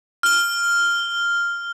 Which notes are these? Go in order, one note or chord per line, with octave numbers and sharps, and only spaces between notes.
F6 G7